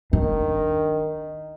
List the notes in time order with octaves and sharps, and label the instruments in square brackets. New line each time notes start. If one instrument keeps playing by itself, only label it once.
[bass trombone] D#3 [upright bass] D4